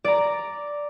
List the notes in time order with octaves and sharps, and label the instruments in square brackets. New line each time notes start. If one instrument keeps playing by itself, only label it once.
[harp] D5 A#5